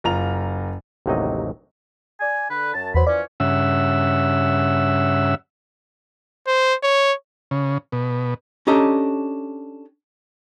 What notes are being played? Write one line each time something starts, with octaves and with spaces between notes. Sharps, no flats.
F#1 F4 A#5 F7
A1 D#2 C3 F#3 D#4 D#5
D5 G#5
D3 B4
F#2 A5
E2 F#3 B3 C5 B5
E3 F3 C#4 D5
G2 C#3 C#4 E5 F#5 E6
C5
C#5
C#3
B2
C#4 D4 G4 A4 D#5 A#5